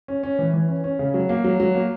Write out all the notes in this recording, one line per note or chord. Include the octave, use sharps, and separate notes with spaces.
C#4
C#4
E3
E3
C#4
C#4
C#3
F#3
A#3
F#3
F#3
A#3